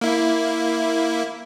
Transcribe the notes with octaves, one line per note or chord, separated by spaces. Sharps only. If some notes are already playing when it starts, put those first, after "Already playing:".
A#3 E4